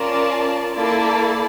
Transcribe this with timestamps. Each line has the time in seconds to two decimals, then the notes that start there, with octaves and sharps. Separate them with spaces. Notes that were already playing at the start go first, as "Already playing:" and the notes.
Already playing: C#4 F4 A#4 D5 A5
0.75 A#3 E4 A4 D5 A5